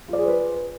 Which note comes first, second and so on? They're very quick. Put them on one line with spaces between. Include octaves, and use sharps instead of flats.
F4 D5 G#4 C5 B4